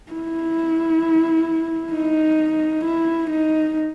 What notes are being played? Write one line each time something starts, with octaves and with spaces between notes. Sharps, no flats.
E4
D#4
E4
D#4